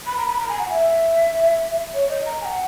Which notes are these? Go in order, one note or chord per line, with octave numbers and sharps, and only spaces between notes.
B5
A#5
B5
A#5
G#5
F#5
E5
C#5
D#5
A#5
G#5
F#5